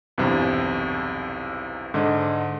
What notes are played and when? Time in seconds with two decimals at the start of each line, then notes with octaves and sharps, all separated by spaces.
0.18 B1 E2 G2 C3
1.94 G#2 D3 D#5